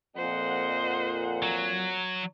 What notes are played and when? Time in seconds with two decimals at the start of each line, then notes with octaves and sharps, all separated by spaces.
0.16 F2 A#2 C5 D#5 F#5
1.43 F#3